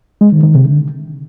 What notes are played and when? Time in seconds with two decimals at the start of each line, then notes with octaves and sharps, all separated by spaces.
0.21 G#3
0.32 D#3
0.43 D#3
0.55 C3
0.66 D3